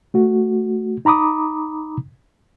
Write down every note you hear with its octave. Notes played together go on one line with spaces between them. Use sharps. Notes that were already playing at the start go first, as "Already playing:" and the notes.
A3 F#4
D#4 A#5 B5 D6 D#6